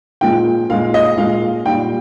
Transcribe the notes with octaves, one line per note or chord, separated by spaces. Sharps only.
A#2 F3 G#3 G5
A#2 G#3 F5
D#5
A#2 G#3 F5
A#2 G3 G5